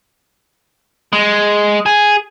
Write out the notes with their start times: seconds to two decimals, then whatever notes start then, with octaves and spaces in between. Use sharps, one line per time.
1.13 G#3
1.86 G#4